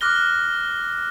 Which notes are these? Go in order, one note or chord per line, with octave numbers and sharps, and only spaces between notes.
D6 F6 F#6 A#6 G7